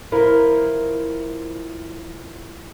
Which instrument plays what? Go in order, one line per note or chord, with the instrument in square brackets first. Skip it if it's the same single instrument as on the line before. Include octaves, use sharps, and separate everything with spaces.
[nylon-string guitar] F3 E4 A#4